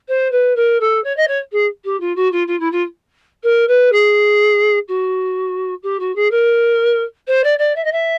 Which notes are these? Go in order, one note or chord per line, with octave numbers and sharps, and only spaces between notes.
C5
B4
A#4
A4
C#5
D#5
C#5
G#4
G4
F4
F#4
F4
F4
E4
F4
A#4
B4
G#4
F#4
G4
F#4
G#4
A#4
C5
D5
D5
E5
D#5
E5